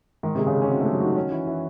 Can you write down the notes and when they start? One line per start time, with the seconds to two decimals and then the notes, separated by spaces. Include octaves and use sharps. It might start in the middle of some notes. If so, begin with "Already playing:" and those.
0.23 G#2 D#3
0.35 C3 G#3
0.47 C#3
0.55 G#3
0.62 C#4
0.70 C4 F#4
0.81 G#3 A3
0.93 F#3
1.00 D#3 F#4
1.16 C#4
1.32 E3
1.47 E3